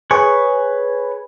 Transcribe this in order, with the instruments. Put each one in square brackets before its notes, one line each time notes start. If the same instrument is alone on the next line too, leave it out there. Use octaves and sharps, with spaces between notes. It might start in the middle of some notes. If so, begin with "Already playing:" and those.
[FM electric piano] G#4 [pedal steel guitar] B4 C#5 C#6